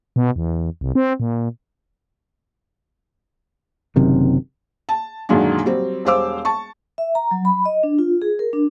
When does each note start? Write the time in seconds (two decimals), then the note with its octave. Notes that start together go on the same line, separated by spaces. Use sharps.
0.16 B2
0.36 E2
0.81 C2
0.95 C4
1.20 A#2
3.96 F#1 F#2 C3 D#3
4.89 A5
5.29 F#2 A#2 D3 D#3 F#3 G#3
5.65 F#3 G3 C4
6.05 E1 G3 C5 F5 D6 E6
6.45 A5 C#6
6.98 E5
7.15 A#5
7.31 F#3
7.45 B5
7.65 D#5
7.83 D4
7.99 F4
8.22 G#4
8.39 A#4
8.53 D4